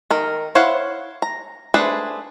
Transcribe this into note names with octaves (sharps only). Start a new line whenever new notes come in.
D#3 A#4
E4 C5 C#5 F5 F#5
A#5
A3 D4 G#4 B4 C5